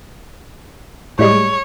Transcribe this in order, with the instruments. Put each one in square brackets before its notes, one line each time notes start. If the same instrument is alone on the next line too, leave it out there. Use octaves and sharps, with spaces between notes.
[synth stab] A2 G3 G#3 [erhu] C#5